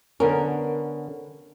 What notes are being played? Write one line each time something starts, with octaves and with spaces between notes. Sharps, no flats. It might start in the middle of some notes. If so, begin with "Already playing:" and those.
D3 B3 C#4 A#4